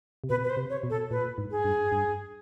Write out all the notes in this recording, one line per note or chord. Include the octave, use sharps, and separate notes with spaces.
C3
B2 B4
B4
C5
C3
C#5
B2
A4
A#2 B4
G#2
G#4
G2
G2